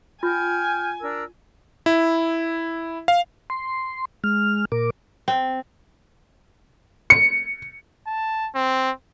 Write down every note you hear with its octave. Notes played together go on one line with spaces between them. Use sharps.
F4 G5 G#5 F6 G6
D4 A#4 E6
E4
F5
C6
G#3 F6
A#2 A#4 D6
C4
C#7
A5
C4